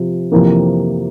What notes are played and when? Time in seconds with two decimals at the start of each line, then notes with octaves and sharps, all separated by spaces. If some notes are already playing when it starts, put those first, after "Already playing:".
Already playing: C3 F3
0.32 F2 C3 E3 A#3